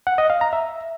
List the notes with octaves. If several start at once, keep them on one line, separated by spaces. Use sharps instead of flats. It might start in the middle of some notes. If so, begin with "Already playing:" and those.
F#5
D#5
F5
A#5
E5